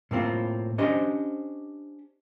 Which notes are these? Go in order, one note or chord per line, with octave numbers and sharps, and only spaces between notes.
A2 A#3 C4 F4
C#4 D4 G4 C5 D#5